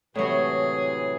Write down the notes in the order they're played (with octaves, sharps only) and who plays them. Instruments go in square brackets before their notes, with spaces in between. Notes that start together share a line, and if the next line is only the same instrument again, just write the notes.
[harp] A2 F#3 [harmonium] C3 E3 [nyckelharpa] G#4